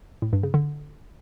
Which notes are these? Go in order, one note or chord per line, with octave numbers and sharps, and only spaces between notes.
A2
G2
C#3
D3